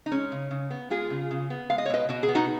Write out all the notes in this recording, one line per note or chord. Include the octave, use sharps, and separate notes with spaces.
D#4
G#3 C#4
C#3
C#3
B3
G#3 F4 G#4
C#3
C#3
B3
G#3 F5
D#5
C#5
B2 B4 D#5
B2 F#4
G#4
B3
D#4 F#4